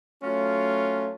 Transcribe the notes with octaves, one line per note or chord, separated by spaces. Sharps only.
F#3 A3 C#4 F4